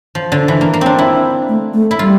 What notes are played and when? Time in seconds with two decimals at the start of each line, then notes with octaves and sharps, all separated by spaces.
0.15 F3
0.32 D3
0.48 E3
0.61 A#3
0.73 A#3
0.81 C4 D4
0.99 E4
1.49 A3
1.74 A3
1.91 E4
1.99 G3 F4